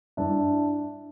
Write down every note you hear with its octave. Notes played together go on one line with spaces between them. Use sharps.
G2 D4 E4